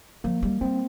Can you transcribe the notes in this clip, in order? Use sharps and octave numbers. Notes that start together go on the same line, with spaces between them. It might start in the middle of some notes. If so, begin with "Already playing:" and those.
F3 A#3
G3
G3 C4